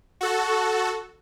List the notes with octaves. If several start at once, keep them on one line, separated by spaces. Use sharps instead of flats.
F#4 A4